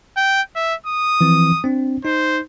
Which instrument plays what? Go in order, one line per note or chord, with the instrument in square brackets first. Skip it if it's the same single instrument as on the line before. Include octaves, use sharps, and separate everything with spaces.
[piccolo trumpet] G5
E5
D#6
[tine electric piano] E3 F3 C4
C4 D4
[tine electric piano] D#4 [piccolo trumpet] C5